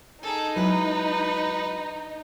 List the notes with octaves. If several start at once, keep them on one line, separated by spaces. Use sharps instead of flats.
D#4 G#4 A4
F#3 G#3 E4 B4